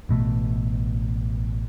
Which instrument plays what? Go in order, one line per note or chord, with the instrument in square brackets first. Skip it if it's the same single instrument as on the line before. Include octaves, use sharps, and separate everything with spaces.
[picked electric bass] A1 B2 A3